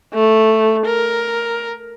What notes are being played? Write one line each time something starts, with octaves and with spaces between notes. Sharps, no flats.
A3
A#4